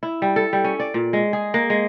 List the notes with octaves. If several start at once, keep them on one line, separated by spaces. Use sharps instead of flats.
E4
G3
A4
G3
C#4
D5
A#2
G#3
G#4
A#3
G#3